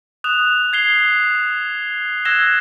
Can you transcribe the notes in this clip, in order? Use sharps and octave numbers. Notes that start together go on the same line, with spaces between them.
D#6 F#6 E7 F7
G#6 C7 G7
E6 F#6 G#6 A#6 E7 G7